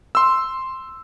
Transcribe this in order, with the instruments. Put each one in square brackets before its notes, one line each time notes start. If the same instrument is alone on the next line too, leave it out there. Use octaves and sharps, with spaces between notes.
[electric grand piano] C6 E6